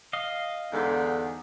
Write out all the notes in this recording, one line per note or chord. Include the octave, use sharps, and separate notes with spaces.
D#5 F5
E2 G#2 D3